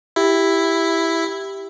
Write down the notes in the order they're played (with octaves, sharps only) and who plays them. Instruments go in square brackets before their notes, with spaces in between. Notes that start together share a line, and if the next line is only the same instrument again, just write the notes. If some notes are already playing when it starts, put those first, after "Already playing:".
[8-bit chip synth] E4 [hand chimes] G4